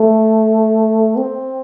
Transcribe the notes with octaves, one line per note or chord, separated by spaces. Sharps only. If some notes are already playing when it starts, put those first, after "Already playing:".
Already playing: A3
C4